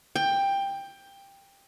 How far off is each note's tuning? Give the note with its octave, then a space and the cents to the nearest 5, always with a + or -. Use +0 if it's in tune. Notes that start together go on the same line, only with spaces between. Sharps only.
G5 +15